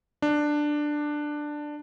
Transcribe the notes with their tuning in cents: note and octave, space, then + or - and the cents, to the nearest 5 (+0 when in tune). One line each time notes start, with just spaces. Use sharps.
D4 +10